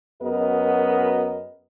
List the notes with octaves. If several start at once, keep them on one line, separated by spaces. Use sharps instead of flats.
F#2 B3 F#4 G#4 A#4 D#5